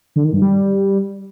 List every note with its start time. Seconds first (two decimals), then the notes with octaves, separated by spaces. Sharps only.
0.16 D3
0.24 D#3
0.33 G2
0.42 G3